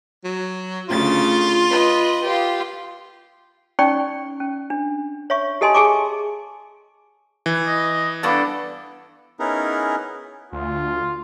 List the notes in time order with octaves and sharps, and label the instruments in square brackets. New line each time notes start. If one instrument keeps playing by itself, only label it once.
[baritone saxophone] F#3
[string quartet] D2 C#3 A6 [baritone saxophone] F4
[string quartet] B4 D#5
F4 G4
[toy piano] C#4 D#4 D5 G5 C#6
C#4
D4
C#5 E5 C#6
G4 A4 D#5 G#5 A5 C6
G#4 G#5 A5 C#6 D6
[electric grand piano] E3
[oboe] D#5
[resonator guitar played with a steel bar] G2 B3 D4 [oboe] A4
[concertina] B3 C#4 D#4 E4 G#4 A#4
[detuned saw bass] D2 [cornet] F4